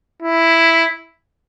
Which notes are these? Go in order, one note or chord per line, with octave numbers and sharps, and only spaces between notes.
E4